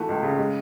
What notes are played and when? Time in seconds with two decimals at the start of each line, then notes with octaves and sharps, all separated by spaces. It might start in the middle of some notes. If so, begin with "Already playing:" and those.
Already playing: E3 A3 F#4
0.09 C#2
0.23 C#3
0.38 G#3